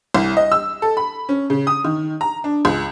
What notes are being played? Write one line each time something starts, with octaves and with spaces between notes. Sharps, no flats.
C2
D#5
E6
A4
B5
C#4
C#3
D#6
D#3
A#5
D4
C#2